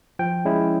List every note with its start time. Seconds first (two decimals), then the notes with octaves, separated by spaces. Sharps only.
0.19 F3 G5
0.45 G#3 C#4 E4